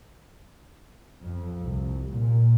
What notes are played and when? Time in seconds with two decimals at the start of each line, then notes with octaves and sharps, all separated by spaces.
1.23 F2
1.62 C2
2.13 A#2